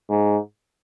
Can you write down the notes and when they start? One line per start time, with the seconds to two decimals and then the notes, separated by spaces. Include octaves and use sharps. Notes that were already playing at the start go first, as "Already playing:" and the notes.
0.10 G#2